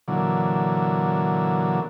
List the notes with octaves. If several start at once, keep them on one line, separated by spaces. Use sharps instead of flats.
A#2 D3 E3 F#3